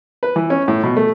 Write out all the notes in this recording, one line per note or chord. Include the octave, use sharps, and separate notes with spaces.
B4
E3
C#4
A2
B2
A3